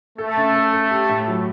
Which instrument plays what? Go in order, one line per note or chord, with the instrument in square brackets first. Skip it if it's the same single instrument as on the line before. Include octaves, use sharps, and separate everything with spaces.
[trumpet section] A3 [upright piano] A4
[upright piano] C#3
A4
A4
G4
A2
F#3